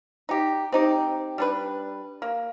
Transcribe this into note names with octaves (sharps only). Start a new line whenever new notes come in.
D#4 G4
C4 D#4 G4
G3 D4 B4
A#3